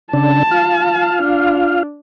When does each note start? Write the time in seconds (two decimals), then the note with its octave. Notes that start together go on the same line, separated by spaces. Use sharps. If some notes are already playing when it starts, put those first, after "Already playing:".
0.13 C#3 D4 A5
0.51 F4 F5
1.23 D4